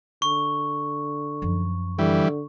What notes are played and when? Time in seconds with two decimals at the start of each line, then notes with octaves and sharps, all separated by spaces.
0.22 D3 C#6
1.42 F#2 F3
1.99 D3 E3 G3